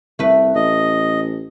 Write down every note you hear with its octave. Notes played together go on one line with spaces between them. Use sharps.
C2 A3 B4
A1 D#5